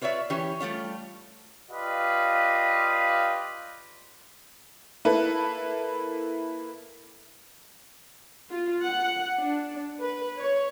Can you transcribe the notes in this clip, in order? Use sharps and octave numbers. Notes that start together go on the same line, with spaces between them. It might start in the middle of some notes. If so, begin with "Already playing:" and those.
F4 B4 C#5 D5 E5
E3 C#4 G4 C#5
G3 A3 F4 C#5
F4 G4 B4 D5 D#5 F5
A#3 E4 A4 B4
F4
F#5
D4
B4
C#5